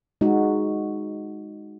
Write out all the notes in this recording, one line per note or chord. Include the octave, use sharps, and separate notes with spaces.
G#3 D#4 F#4